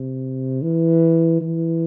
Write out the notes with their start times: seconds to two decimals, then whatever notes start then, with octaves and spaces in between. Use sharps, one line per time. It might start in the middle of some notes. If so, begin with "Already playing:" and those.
Already playing: C3
0.62 E3
1.41 E3